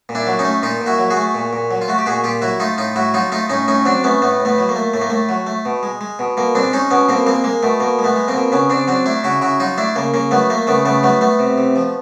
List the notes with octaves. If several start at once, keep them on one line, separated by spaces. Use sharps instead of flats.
A#2
D4 E4
F#3
C#4 D#4
A3
A#2 D#4 F4
A#2
E4 F#4
F#3
F#4 G#4
A3
A#2
A#2
F#3
F4
A3 F#4
G4
A#2 F#4 G#4
A#2 F4 G4
F#3 E4 F#4
A3 D#4 F4
A2 D#4 F4
A2 E4 F#4
F#3 D#4 F4
A3 D#4 F4
A2 C#4 D#4
A2 C#4 D#4
F#3 C4 D4
A3 B3 C#4
A2 A3 B3
A2
A3 B3
F#3
A#3
A3
A2 A3
A#3
A2 A3
F#3
A3
B2
G#3
G#3
B2
B2 A#3
G#3 C4 D4
G#3 C#4 D#4
B2 B3 C#4
B2 A#3 C4
G#3 A#3 C4
G#3 A#3
B2 A3
B2 A#3
G#3
A3 B3
G#3
A#3 C4
B2
C#3 B3 C#4
C#3 C4 D4
F#3 C4 D4
A3 D4 E4
C#3 E4 F#4
C#3 E4 F#4
F#3 D#4 F4
A3 D4 E4
C#3 A#3
C#3 A#3
F#3 A3 B3
A3 A#3
C#3 A3 B3
C#3 A3 B3
F#3 A3 B3
A3 B3
C3
C3
F3